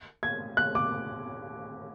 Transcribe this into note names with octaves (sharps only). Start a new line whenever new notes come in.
G#6
F#6
D6